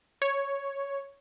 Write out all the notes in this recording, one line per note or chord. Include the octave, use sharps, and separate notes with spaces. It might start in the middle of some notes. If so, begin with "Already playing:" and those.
C#5